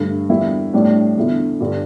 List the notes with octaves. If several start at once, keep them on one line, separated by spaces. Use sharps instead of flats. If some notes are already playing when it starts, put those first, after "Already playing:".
Already playing: G2 D3 A3
E2 D3 G3 A#3 E4
A2 G3 D4
E2 D3 A3 E4
G2 D3 G3 D4